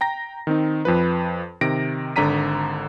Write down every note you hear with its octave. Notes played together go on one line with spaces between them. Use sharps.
G5 A#5 A#6
D#3 C4 D#4
F2 F3 B4
C3 D#3 A#6 D7
G#1 D3 D5 A#5 B6 D#7